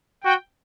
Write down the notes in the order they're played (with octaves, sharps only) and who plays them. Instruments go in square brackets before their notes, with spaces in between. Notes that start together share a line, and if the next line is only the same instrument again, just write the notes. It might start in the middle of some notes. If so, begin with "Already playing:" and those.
[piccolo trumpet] F#4 [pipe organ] G5